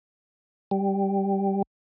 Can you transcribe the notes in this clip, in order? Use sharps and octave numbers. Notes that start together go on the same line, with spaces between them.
G3